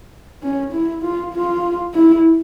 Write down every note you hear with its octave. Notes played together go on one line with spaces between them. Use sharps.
C#4
E4
F4
F4
E4